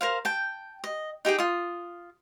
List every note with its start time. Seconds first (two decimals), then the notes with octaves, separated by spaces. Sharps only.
0.01 A#4 C5 F5
0.25 G5 A5
0.84 D#5
1.25 D#4 G4 G#4 G5
1.39 F4 D#6